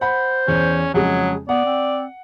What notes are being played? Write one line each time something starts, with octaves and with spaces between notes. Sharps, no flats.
C5 F#5 B5
E2 C#4
F2 C#3 F#3 G#3 G#4
B3 D5 F#5
C4